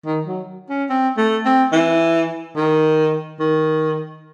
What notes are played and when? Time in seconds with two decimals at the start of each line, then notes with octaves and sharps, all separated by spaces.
0.06 D#3
0.27 F#3
0.69 C#4
0.90 C4
1.18 A3
1.45 C4
1.73 E3
2.56 D#3
3.40 D#3